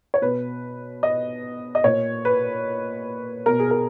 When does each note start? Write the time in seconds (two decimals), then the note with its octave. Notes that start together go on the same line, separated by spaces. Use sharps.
0.14 C#5
0.22 B2 B4
1.03 D#5
1.75 D#5
1.84 A#2 C#5
2.25 B4
3.46 B2 A#4
3.59 G#4
3.71 A#4